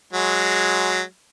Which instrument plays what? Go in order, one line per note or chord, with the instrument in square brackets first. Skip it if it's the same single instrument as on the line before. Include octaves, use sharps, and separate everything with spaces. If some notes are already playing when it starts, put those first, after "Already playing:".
[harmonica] F#3 G#3